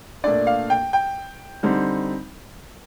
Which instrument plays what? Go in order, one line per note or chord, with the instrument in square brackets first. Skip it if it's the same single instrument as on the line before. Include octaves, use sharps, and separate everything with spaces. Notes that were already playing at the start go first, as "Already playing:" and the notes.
[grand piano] A#2 A3 D4 D5
F5
G5
G5
D3 G3 C4 D#4